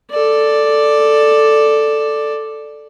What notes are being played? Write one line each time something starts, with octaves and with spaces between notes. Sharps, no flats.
A4 D5